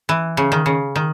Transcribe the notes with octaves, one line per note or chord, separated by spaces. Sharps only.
E3
C#3
D#3
C#3
D#3